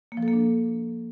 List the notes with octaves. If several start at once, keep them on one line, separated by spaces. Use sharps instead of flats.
A#3
F3
A4
A#3
D4